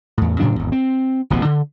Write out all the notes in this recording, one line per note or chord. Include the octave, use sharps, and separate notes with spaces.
E2 A2
A2 C#3 F#3 D4
G#1 E2
C4
D1 A1 B2 B3
D3